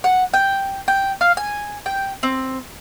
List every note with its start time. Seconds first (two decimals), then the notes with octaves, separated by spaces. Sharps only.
0.04 F#5
0.34 G5
0.88 G5
1.21 F5
1.37 G#5
1.86 G5
2.23 C4